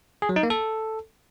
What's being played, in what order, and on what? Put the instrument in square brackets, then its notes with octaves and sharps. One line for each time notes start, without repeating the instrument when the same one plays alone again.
[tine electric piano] G#4
F#3
D#4
A#3
A4